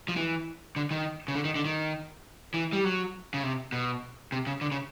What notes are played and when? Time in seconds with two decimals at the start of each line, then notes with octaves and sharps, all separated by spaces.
0.08 F3
0.16 E3
0.76 D3
0.91 D#3
1.28 C#3
1.35 D3
1.45 D#3
1.56 D3
1.65 D#3
2.54 E3
2.73 G3
2.84 F#3
3.34 C#3
3.43 C3
3.72 B2
4.32 C3
4.47 C#3
4.61 D3
4.72 C#3